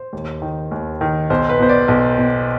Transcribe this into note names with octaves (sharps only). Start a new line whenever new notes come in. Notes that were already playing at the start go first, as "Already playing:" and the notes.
Already playing: C5
D#2
D#3
D#2
D#3
B1 C5
B4
B2 C5
D5
B1
B2